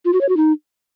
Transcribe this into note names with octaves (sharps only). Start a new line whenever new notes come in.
F4
F#4
C#5
F#4
D#4